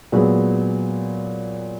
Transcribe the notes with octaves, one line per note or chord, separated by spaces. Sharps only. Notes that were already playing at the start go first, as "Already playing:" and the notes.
A#2 F#3 G#3 B3